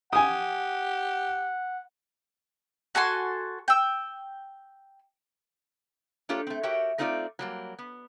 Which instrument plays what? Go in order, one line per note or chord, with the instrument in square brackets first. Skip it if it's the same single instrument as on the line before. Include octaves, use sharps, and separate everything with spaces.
[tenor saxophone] G4 [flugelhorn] F#5 [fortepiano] G#5 D#6
[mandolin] F#4 A4 G#5 C6
G5 E6
[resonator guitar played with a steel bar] A#3 D4 F4 G4 A4 C#5
A3 C4
F#4 G4 A#4 C#5 E5 G5
A3 C4 D#4 F4 C#5 D5
F#3 G3 A#3
B3